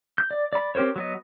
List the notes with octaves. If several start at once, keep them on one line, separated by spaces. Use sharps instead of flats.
G6
D5
D5 B5
C4 G4 A#4 C5 C#5
F#3 B3 D#5